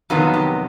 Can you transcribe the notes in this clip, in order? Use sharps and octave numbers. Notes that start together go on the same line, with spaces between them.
F2 C3 D#3 F#3 B3 F4
G4